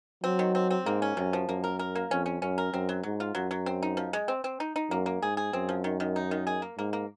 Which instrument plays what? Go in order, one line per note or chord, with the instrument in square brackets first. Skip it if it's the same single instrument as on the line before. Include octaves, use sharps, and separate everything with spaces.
[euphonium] F#3 [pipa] C4
[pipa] D#3
C4
C4
[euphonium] G#2 [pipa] A#3
[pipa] C#4
[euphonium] F#2 [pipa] C3
[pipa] F3
[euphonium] F#2 [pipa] A#3
[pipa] A#4
A#4
A#3
[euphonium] F2 [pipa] C#4
[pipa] C#4
[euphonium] F#2 [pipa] C#4
[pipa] A#4
[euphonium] F#2 [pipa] C4
[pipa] F#3
[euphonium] G#2 [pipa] F#3
[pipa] F4
[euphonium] F#2 [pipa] F#3
[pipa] F#3
C4
D#4
F3
G#3
C4
C4
D#4
D#4
[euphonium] F#2 [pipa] A#3
[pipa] A#3
[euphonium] G#2 [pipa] G#4
[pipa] G#4
[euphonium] F#2 [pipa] C4
[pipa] F3
D#3
D#3
D#4
D#3
G#4
A#3
[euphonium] G#2 [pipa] A#3
[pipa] A#3